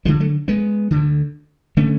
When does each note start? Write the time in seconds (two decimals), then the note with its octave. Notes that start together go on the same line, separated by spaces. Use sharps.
0.05 D2 D3 F3 G#3
0.20 F#3 A3
0.48 G#3 B3
0.91 D2 D3
1.77 D3 A3 C#4